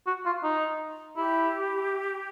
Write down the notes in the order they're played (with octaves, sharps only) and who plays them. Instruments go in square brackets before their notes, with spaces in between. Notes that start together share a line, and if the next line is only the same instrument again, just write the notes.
[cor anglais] F#4
F4
D#4
[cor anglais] E4 [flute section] G4